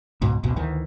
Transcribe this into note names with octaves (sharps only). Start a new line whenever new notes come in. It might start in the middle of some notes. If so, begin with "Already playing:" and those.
C#2 G#2 B2
A1 D2 B2
D2 D#3 E3